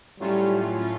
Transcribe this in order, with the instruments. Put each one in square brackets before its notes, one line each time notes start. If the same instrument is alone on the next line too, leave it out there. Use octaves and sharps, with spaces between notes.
[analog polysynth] A2 F#3 A3 C#4 F4 [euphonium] G3
[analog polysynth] A2 F#3 A3 C#4 F4